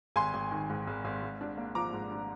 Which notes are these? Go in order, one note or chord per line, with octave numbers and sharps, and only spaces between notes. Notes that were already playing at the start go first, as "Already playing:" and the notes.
G#1 G#5 C6
G#1
D#3
G#2
G#1
G#1
G#2
D4
A#3
F3 A#5 D6
G#2
D4